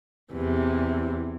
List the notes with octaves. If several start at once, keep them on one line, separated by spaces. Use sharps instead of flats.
E2 C3 E3